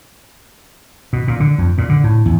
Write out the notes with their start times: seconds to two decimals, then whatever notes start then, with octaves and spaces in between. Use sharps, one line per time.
1.13 B2
1.28 A#2
1.40 D3
1.58 F2
1.78 A#2
1.89 D3
2.04 A2
2.26 E2